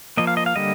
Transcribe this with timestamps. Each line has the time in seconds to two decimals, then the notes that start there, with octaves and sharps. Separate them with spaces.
0.17 F3 A#3 D#5
0.27 F5
0.37 D#5
0.46 F5
0.56 D3 G3 A#3 D#5